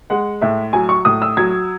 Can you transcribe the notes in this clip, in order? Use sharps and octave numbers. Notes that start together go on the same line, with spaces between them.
G#3 F#5
A2 E5
F#3 G#5
C#6
A2 D#6
E6
F#3 G#6